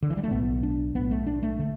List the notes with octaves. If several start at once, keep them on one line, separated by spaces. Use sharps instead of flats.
D3
E3
G3
A3
B1 A2 B3
D4
B1 A2 B3
A3
D4
A3
D3 A3